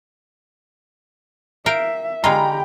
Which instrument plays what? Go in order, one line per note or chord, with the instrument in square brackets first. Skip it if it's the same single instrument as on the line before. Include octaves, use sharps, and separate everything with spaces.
[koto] A#4 F5 G5 [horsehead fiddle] E5
[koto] D3 G#3 F4 [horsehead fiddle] G4 G5 [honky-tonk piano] A#5 B5